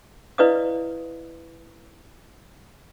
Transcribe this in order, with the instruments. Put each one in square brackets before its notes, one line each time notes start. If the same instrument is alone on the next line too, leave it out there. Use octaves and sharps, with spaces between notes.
[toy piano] E4 B4 D5 D#5 F5 D#6